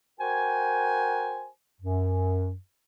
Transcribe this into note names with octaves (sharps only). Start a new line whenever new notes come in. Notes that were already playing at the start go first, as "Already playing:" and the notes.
F#4 A#4 C5 G5 G#5
F#2